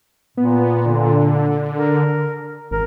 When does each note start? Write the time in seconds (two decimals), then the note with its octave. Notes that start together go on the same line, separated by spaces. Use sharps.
0.37 A#2 B3
0.86 D3
1.76 A#4
2.71 G#1 A#4